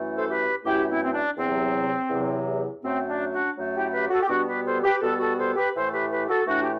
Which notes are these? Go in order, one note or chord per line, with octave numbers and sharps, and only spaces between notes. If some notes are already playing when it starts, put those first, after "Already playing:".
Already playing: F#2 E3 A3
A4 C5
G4 B4
F#2 E3 A3 E4 G4
C4 E4
C4
D4
E2 C3 F#3 C4
E2 C3 F#3
F#2 F#3 A3 C4
D4
D4 F#4
F#2 F#3 A3
E4 G4
G4 B4
F#4 A4
G4
B2 G3 B3 D4 F#4
G4 B4
A4 C5
G4 B4
B2 G3 B3 F#4 A4
F#4 A4
A4 C5
G4 B4
A2 E3 A3 A4 C5
G4 B4
G4 B4
F#4 A4
A2 E3 A3 D4 F#4
G4